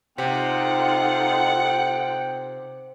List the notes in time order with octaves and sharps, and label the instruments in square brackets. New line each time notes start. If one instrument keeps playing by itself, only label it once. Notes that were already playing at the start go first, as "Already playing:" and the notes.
[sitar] C3 [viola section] D#4 F4 A4 [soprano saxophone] F#5 [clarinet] G5